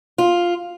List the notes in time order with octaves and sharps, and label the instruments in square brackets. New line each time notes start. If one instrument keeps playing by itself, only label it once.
[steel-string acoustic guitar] F4